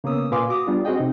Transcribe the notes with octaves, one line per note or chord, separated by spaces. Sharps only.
C#3 A#3 B3 C#4 D#6 E6
A#2 B4 F5 G#5 C6 D6
F#4 D6 D#6
G3 B3 D4 F4
C4 F#4 G#4 D#5 G5
C3 D#4